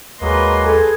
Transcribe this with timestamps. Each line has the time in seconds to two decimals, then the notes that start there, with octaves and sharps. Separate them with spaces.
0.21 D#2 F#3 G#3 A#3 B4 D#5 C6
0.62 G#4 A4